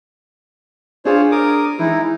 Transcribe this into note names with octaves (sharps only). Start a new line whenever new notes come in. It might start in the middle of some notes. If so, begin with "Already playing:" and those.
D4 F4 G#4 C5 C#5
A#4 D6 D#6
E3 G#3 D#4 E4